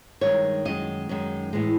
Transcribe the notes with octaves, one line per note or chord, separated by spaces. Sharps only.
G2 D#3 G#3 C#5
F#2 D#3 G#3 D#5
F#2 D#3 G#3
A2 E3 G#3